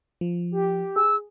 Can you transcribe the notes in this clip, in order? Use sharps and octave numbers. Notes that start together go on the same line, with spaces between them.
F3
G4
G#4 E6